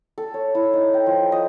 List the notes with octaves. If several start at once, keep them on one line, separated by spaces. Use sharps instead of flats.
A4
C#5
E4
D#4
G5
F3
D#5